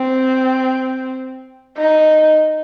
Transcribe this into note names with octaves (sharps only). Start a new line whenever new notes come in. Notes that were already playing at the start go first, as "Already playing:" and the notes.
Already playing: C4
D#4